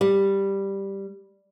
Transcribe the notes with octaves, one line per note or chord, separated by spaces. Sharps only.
G3